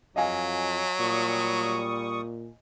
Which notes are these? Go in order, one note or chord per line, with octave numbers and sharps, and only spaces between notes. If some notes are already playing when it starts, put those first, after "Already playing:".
F2 F#3 D#5 F5 G#5
A#2 G3 C#6 D#6